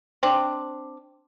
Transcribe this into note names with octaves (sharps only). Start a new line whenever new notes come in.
C4 D4